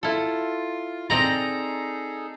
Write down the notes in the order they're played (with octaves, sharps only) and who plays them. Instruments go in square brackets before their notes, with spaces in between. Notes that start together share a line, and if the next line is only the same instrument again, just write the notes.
[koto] E4 A4 [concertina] F4
[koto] C4 D5 D#5 [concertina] D#4 G#4 A4 [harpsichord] A#5